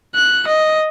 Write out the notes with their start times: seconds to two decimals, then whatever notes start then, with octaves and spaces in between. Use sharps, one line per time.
0.15 F#6
0.47 D#5